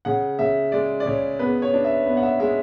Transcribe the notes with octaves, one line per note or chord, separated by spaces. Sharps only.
C#3 F#5
C#3 E5
G#3 D5
D5
C#3 C#5
B3 B4
C#5
D4
E5
B3
F#5
E5
G#3 E5